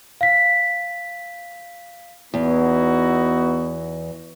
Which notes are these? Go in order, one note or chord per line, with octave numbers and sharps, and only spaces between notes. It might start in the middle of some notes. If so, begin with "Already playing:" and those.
F5 B6
E2 B3 D#4 E4 F#4